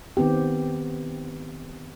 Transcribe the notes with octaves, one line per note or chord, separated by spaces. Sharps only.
D#3 B3 C4 G4